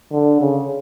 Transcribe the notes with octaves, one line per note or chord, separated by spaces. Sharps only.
D3
C#3